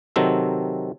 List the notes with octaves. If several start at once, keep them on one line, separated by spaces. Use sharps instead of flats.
C3 D#3 F#3 C4 A4